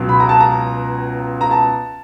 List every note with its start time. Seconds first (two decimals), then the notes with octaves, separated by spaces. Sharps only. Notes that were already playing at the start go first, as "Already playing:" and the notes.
Already playing: C#2 B2 F#3
0.09 B5
0.20 A#5
0.29 A5
0.40 A#5
1.41 A#5
1.51 A5